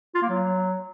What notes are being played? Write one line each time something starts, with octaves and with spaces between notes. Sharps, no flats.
F4
A#3
F#3